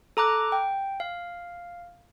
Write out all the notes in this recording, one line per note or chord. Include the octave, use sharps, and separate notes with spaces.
A4 A#5 D6 F#6
G5
F5